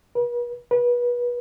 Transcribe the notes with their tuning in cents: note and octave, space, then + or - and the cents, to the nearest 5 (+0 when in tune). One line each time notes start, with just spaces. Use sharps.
B4 -45
B4 -30